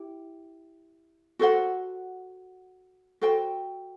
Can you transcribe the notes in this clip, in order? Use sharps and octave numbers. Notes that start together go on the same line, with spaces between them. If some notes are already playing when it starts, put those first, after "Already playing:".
Already playing: E4 G4
F#4 A4 C5 F#5
F#4 A4 C5 G5